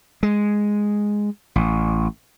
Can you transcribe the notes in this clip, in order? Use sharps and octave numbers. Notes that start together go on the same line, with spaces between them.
G#3
A1